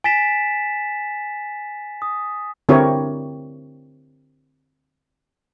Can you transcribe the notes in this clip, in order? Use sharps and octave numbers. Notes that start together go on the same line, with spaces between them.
G#5 A6 B6 E7
D#6
D3 C4 E4 G4 A#4 C#5